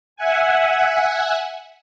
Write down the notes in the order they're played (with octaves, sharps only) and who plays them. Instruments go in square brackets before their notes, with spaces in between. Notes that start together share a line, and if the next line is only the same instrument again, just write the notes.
[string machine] E5 F#5 G#5